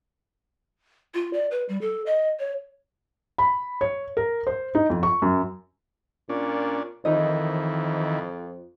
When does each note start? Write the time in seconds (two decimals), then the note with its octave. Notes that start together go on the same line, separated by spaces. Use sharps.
1.14 F4
1.33 D5
1.51 B4
1.69 G3
1.81 A4
2.06 D#5
2.39 C#5
3.38 B5
3.81 C#5
4.17 A#4
4.47 C5
4.75 D#4
4.90 F2
5.03 C#6
5.22 F#2
6.29 A#2 C#4 D4
7.05 F2 D#3 E3 D#4 A#4 D#5